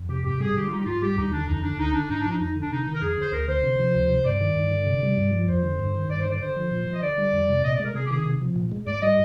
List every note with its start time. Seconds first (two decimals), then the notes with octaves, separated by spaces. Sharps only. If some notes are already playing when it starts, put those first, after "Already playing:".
Already playing: F2
0.09 C3 G4
0.24 G#2 G4
0.40 G3 G#4
0.56 D3 G4
0.67 F4
0.71 G3 D#4
0.80 G4
0.86 G#2 F4
1.02 G3 G4
1.18 D#2 D#4
1.32 D3 D4
1.47 F2 D#4
1.63 D3 D4
1.78 D2 D#4
1.94 D3 D4
2.10 G#2 D#4
2.20 D4
2.26 F3 D#4
2.40 F2 D#4
2.56 D3
2.61 D4
2.71 C3 D#4
2.86 D#3 D#4
2.95 A#4
3.02 F2 G#4
3.18 D3 C5
3.32 D2 A#4
3.48 D3 C5
3.64 C3
3.79 F3
3.95 D2
4.09 C3
4.25 G2 D5
4.41 D#3
4.56 G2
4.71 D3
4.87 C3
5.03 G3
5.17 G2
5.33 F3
5.48 F2 C5
5.64 D3
5.79 G2
5.94 D#3
6.09 G2 D5
6.20 C5
6.25 D3
6.31 D5
6.41 D3 C5
6.56 F3
6.71 A#2
6.88 F3
6.94 D#5
7.03 D3 D5
7.18 G3
7.33 F2
7.49 C3
7.64 A#2 D#5
7.74 D5
7.79 G#3
7.85 A#4
7.95 C3 G#4
8.06 G4
8.11 D#3 G#4
8.26 C3
8.42 F3
8.56 A#2
8.72 G#3
8.87 G#2 D5
9.02 G3 D#5